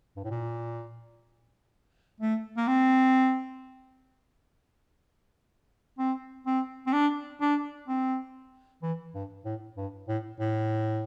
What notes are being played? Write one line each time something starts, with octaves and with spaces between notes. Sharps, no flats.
G2
A2
A#2
A3
A#3
C4
C4
C4
C4
D4
D4
C4
E3
G2
A2
G2
A2
A2